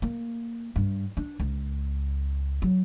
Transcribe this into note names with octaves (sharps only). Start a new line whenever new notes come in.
A#3
G2
D4
C#2
F#3